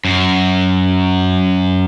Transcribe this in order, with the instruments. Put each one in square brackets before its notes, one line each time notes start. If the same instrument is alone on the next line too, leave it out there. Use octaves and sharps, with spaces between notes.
[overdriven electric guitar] F#2